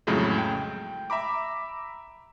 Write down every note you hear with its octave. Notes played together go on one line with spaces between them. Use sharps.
F2 A2 C#3 F#3 G#3 A3
G5
E5 A#5 B5 D6